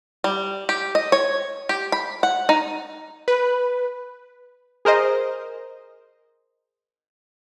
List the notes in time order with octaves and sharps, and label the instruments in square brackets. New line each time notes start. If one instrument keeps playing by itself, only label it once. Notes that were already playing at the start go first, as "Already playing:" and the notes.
[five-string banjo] G3
G4
D#5
C#5
G4
B5
F#5
D#4
[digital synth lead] B4
[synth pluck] G#4 A#4 C5 D#5